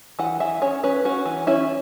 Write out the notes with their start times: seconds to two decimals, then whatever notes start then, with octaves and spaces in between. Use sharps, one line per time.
0.19 E3 F#5
0.40 E3 E5
0.62 C#4 C#5
0.84 C#4 B4
1.05 C#4 F#4
1.26 E3
1.47 C#4 E4